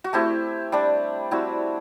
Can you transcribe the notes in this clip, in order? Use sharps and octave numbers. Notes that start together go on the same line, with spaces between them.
F#4
A3 C4 E4 G4
G3 D4
G3 C4 E4 F#4